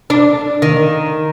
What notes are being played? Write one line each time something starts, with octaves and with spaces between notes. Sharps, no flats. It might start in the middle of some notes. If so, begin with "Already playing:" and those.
D4
D#3